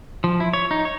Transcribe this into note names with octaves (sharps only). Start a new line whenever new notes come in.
F3
E4
C#5
D#4
C#5